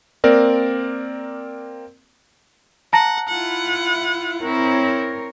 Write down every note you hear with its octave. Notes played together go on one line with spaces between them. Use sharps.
A#3 C4 A#4 D5
F#5 A5 A#5 A#6
E4 F4 F#5
C4 E4 A#4 C#5